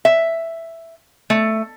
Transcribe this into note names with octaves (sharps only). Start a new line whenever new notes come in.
E5
A3